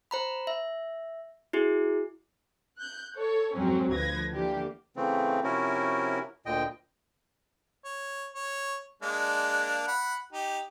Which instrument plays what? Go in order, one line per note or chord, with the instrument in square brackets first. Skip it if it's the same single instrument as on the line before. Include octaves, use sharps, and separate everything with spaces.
[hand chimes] C5 A#5 B5
E5
E4 F#4 G#4
[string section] F#6 G6
A4 C#5
F2 G#2 F#3 C4 C#4
D2 F3 B4 G#6 A#6
D3 E3 A#3 G4
[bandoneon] C#3 E3 A3 C4
C3 F3 C#4 E4 F#4 A#4
D2 A#2 D3 D#5 G5
[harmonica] C#5
C#5
G#3 A#3 D4
F#5 B5
D#4 G4